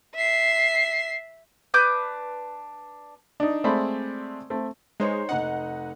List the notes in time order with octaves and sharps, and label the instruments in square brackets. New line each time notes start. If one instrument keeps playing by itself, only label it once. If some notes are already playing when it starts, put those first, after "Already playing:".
[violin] E5 C7
[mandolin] D4 B4 D6 G6
[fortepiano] D4 D#4
G#3 A3 C4 C5 D5 B5
A3 C4
[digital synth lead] G#3 [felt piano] D#4 C5 C#5
[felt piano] F1 D#4 D#5 [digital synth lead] F#5